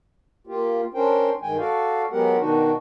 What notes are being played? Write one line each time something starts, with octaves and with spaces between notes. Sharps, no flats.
A#3 F4 G4
C#4 D4 A#4 C5 G5
G2 D#3 G#3 G5 G#5
F#4 A4 D5 F5
F#3 G#3 B3 G4 A#4 F#5
B2 D#3 D4 D#4 F#4